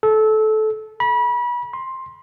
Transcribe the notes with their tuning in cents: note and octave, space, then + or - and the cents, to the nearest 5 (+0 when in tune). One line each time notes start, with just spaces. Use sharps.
A4 -20
B5 -30
C6 +10